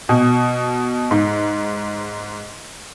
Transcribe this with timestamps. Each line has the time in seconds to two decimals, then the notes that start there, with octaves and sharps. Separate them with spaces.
0.09 B2
1.11 G#2